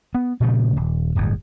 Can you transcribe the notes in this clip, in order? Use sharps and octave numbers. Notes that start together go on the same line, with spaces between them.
B3
A#2 C#3 F3 A3
D#1
D1 G1 E2